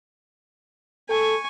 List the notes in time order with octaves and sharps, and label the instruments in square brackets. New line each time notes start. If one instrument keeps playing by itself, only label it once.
[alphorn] A4 [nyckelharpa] G#5 C#6